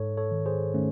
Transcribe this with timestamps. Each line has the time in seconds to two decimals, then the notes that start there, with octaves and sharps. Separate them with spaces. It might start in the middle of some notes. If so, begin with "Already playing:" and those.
Already playing: G#2 A4 C#5
0.17 A4 C#5
0.31 D#3
0.46 G#4 C5
0.74 D#3 A3 C#4